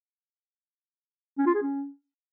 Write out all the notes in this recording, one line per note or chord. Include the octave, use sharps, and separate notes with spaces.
C#4
F4
G#4
C#4